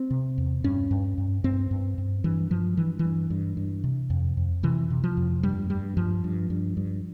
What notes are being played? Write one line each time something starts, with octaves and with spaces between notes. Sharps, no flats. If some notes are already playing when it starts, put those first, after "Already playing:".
Already playing: C4
C3
E2
G2 C#4
G2
G2
G2 C4
G2
G2
G2 E3
G2 F3
G2 E3
E3
G2
G2
G2
C3
F2
F2
C3 E3
C3
F3
F2
G2 G3
G2 G3
G2 F3
G2
G2
G2